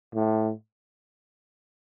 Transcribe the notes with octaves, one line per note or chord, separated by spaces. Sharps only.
A2